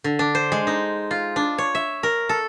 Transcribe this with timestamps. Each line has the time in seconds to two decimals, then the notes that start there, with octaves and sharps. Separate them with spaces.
0.04 D3
0.19 D4
0.35 C5
0.52 G#3
0.67 D#4
1.11 F4
1.36 D4
1.58 C#5
1.75 E5
2.03 A#4
2.29 A4